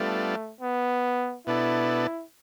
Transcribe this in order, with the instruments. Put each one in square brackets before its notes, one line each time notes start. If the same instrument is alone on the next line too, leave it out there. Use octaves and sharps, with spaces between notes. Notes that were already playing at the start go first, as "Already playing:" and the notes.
Already playing: [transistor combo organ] G3 B3 D4 F4 A4 [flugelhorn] A3
[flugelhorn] B3
[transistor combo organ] B2 B3 D4 A4 [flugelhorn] E4